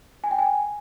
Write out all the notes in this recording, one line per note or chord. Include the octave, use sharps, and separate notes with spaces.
G#5
G5
G#5